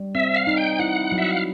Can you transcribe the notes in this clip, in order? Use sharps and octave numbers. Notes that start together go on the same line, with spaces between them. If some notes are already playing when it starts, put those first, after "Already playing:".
Already playing: G3
C4 E5
F5
D#4
G5
E4 F#5
F#3
E5
F5